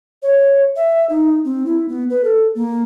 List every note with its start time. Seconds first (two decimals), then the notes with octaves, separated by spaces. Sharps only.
0.23 C#5
0.76 E5
1.10 D#4
1.45 C4
1.66 E4
1.89 B3
2.10 B4
2.24 A4
2.55 A#3